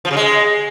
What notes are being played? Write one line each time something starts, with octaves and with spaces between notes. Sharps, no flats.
F3
C#3
G#3